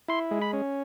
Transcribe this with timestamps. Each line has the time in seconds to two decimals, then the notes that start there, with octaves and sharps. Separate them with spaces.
0.08 E4 C6
0.31 G#3
0.42 B5
0.53 C#4